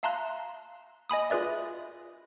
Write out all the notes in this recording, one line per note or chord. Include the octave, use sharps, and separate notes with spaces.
E5 F5 A5 A#5 C6 F#6
D#5 G#5 B5 D#6
F4 G#4 B4 D5 E5